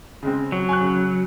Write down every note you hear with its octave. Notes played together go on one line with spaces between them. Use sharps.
C#3 G#3 C4
F#3
G#5 C#6 F#6
C#3